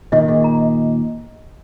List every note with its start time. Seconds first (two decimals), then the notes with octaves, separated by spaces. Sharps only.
0.12 A#2 D#3 D#5
0.28 A#2 D#3 G#4
0.44 A#5
0.60 D#5